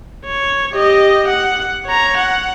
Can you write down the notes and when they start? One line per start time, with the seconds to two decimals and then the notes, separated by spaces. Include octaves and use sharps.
0.25 C#5
0.72 G4 D#5
1.28 F#5
1.86 C#5 A#5
2.17 F#5